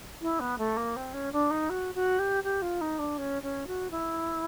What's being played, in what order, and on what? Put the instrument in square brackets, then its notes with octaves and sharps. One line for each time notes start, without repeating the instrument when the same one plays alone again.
[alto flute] E4
B3
A3
A#3
C4
C#4
D4
D#4
F#4
F#4
G4
G4
F4
D#4
D4
C#4
C#4
F#4
E4